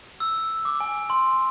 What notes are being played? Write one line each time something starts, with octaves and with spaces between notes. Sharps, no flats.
E6
D6
G#5
C6